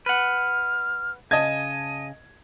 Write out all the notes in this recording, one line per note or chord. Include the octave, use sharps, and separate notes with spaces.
B4 F#5 F6
C#3 D#5 A5 G#6 D#7